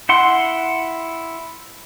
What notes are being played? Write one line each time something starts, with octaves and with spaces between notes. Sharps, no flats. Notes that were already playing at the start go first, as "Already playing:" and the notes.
E4 F#5 C6